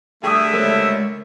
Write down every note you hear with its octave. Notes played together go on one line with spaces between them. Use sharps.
D3 G3 A3 G#4 E5 G5 C#6 D#6
G#3 A#4 C5 C#5 D#5